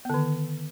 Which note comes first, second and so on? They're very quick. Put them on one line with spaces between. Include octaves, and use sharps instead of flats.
B3 D3 D#3